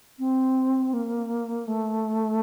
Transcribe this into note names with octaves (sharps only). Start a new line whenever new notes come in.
C4
A#3
A3